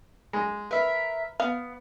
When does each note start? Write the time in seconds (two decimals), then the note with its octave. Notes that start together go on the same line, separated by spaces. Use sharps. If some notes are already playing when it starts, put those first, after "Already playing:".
0.33 G#3
0.71 A#4 B4 E5
1.40 B3 F5